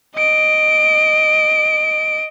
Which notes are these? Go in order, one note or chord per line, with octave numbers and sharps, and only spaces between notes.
D#5 D7